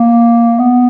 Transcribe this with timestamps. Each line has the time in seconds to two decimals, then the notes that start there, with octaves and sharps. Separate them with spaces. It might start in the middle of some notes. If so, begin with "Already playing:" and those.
Already playing: A#3
0.59 B3